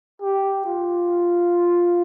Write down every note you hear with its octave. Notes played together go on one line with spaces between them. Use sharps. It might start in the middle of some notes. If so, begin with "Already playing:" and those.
G4
F4